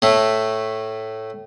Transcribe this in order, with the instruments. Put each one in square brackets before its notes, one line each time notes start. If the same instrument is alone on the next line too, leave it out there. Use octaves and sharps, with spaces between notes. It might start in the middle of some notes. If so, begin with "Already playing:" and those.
[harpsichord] A2 A3